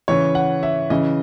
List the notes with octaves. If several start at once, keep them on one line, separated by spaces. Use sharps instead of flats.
C#3 E3 C#5
F#5
E5
C#3 E3 D#5